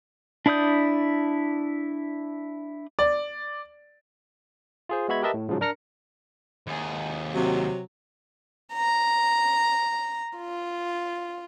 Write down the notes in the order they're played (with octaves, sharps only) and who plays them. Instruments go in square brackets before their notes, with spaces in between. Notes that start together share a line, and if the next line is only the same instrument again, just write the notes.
[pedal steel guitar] D4 E4 D5 D#6 G6
[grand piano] D5
[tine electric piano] F4 G#4 C5
G#3 B3 F#4 E5 B5 G#6
G4 A#4 B4 D#5 E5 A5
A2
G#2 C#3 F3 F#3
D4 A#4 A#5 F6 A#6 C#7
[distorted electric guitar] D#2 G#4
[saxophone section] C3 F#3
[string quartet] A#5
F4